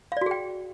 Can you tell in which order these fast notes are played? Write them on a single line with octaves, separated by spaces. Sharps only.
F5 D5 F#4 G#4 G5